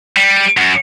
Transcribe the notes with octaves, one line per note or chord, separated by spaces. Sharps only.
G3
F#2